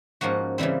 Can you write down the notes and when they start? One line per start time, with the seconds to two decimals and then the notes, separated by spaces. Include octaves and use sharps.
0.21 G#2 F3 A#3 C#4 F#4
0.58 C#3 E3 G3 C4